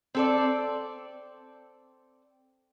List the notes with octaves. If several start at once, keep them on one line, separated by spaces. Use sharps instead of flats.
C4 A4 D5